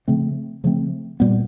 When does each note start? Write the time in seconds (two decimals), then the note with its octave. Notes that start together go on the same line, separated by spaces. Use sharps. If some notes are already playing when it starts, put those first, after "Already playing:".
0.08 C#3 F3 A3 C4
0.64 C#3 F3 A3 C4
1.20 A#2 G3 B3